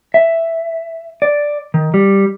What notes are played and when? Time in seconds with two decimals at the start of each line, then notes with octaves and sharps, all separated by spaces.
0.14 E5
1.22 D5
1.74 D#3
1.94 G3